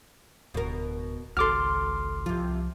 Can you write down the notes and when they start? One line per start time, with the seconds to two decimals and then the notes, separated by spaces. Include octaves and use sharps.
0.54 D1 B2 A#4
1.37 G#1 C#2 F#4 A4 C6 D6 F6
2.26 C2 C3 F3 F4